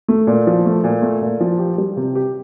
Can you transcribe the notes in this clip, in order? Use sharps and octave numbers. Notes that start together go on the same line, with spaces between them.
A3
A#2
F3
A3
A#2
A3
A#2
F3
G4
G3
C3
G4